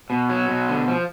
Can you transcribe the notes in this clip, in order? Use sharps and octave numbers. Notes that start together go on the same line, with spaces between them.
B2
F#3
B2
D3
F3